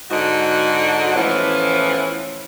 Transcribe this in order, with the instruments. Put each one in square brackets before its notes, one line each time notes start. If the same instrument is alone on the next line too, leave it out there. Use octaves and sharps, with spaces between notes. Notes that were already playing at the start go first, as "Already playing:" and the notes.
[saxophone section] G#2 D3 D#4 F#4
A2 E3 F3 B3 C#4 E4